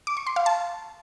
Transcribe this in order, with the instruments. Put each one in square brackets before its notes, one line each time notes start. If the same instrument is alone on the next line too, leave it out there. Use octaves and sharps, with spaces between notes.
[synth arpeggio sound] D6
C#6
C6
F5
A5